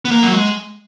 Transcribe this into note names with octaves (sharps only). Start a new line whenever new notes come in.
B3
A#3
F#3
G#3